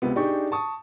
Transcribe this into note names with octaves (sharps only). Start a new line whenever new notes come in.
C#2 C3 B3
D4 D#4 G4 G#4 D5 C#6
A5 C#6 D#6